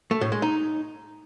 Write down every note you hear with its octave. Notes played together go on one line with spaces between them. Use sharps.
A3
A2
G#3
D#4